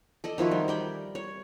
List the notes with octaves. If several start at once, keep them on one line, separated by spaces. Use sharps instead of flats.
A4 D5 D#5
D#3 F3 E4 F#4
G3
A#4 D5 G5
C#5